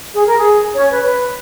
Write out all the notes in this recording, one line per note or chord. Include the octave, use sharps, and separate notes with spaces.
G#4
A#4
G#4
C#4 C#5
B4
B4